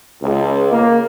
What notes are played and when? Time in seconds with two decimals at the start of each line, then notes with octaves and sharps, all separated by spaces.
0.22 C#2
0.72 A#3